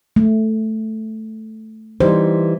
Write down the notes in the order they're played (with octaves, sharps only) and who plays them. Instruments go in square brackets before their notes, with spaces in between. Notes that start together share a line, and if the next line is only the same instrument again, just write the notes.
[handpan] A3
[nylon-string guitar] E3 G3 D#4 [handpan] C5